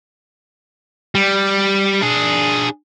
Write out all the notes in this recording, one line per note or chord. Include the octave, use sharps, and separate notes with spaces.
G3
D4 G#4